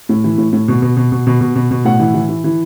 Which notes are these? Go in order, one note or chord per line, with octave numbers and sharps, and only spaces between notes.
A2
E3
A2
A2
B2
B2
B2
B2
B2
B2
B2
B2
A2 F#5
E3
E3
E3
E3